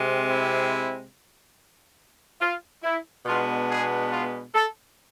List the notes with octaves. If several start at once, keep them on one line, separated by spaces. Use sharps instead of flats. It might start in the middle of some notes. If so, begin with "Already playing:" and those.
Already playing: C3 G#3 C4
E4
F4
E4
B2 G#3 B3 D4 F4
G#4
F4
A4